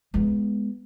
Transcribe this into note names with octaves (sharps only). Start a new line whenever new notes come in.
G#3 B3